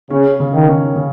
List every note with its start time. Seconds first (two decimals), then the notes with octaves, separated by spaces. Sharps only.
0.10 C#3 C#4
0.40 C#3
0.54 D#3
0.68 C#4
0.96 C#3